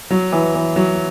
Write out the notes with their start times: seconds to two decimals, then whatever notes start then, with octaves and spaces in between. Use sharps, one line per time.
0.10 F#3
0.32 E3
0.55 E3
0.76 F#3